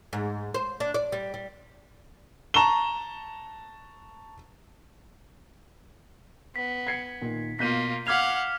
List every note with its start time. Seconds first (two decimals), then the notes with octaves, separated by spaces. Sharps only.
0.13 G#2
0.54 C5
0.80 D4
0.94 D5
1.12 G3
1.34 G3
2.54 A5 A#5 C#6 E7 G7
6.56 B3 B6
6.87 G#6 C7 C#7
7.22 A#2 D#3
7.59 B2 A#3 F4 G6 B6 D#7
8.07 F5 F#5 D6 F6 G#6 B6 F7